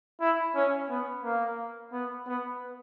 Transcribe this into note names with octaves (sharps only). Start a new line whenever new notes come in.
E4
C#4
B3
A#3
B3
B3